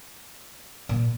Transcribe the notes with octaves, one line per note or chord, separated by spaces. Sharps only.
A#2